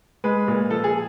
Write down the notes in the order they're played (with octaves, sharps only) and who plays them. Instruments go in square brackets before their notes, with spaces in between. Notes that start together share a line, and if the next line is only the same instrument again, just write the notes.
[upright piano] G#3 B4
A#2
F3 A4
G#4